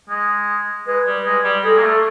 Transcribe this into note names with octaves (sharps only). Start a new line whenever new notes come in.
G#3
G#3 B4
G3
G#3
G3
G#3 A4
A#3
A3